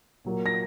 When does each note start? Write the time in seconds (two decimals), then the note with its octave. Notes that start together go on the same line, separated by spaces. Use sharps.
0.25 A#2 F#3 A#3
0.46 A#6